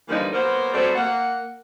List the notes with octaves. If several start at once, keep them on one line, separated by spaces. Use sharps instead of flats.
D3 E3 F3 G3 A#3 D#4
F#3 A#3 B3 A#4 C5
F#3 G3 A3 C4 F#4 C5
A#3 F#5